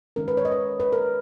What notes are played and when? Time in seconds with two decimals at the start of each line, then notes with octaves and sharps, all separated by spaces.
0.16 D#3 G#3 C#4 A#4
0.28 B4
0.37 C#5
0.45 D#5
0.52 C#5
0.80 B4
0.92 A#4